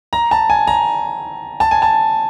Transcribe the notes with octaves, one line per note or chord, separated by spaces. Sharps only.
A#5
A5
G#5
A#5
A5
G#5
A5